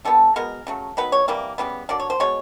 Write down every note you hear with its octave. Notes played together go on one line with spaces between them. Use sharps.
D3 G3 B3 A4
B2 G#3 B3 A#4
C#3 F#3 A3
D#3 F#3 B3 B4
C#5
C3 E3 G3 A#3
C#3 E3 G3 B3
D3 F#3 A#3 D5
C#5
C5
B2 G#3 C#5